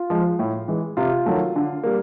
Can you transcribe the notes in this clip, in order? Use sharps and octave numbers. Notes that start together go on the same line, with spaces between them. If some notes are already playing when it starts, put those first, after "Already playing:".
Already playing: F4
F3 G#3
A2
E3 G#3
C3 F4
D#3 F#3 A3
D3
G3 A#3